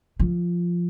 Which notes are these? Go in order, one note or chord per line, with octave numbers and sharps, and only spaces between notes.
F3